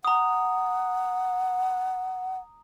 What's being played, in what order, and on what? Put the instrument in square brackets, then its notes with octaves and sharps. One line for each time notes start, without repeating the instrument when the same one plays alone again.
[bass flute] F#5 [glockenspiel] A#5 D#6